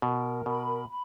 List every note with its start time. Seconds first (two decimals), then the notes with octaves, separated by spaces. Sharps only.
0.02 B2 A#4
0.46 B2 B5
0.89 B5